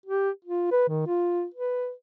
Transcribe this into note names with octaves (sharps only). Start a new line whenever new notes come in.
G4
F4
B4
D#3
F4
B4